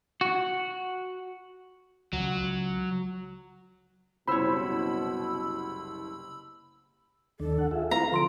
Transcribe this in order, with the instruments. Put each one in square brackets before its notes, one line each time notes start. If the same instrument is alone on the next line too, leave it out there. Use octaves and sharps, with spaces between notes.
[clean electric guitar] F#4
[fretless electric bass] C#2 [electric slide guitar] F#3
[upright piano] F#1 C2 [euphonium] B2 [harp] C5 C#5 [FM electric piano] B5 E6
[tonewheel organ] D#2 D#3 D4 [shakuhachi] A4
[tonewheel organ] F#5
F4 G#4 E5
[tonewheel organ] C4 E4 B4 [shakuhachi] F5 [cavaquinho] A#5
[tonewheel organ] D3 F3 [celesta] F4 C6 D7 [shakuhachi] A4